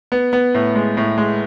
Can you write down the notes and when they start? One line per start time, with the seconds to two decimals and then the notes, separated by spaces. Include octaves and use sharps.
0.12 B3
0.33 B3
0.55 A2
0.75 G#3
0.97 A2
1.18 G#3